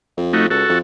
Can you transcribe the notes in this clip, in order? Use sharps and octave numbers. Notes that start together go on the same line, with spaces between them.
F2
A3 D#4 F#4
C#2 F#4 A4
F2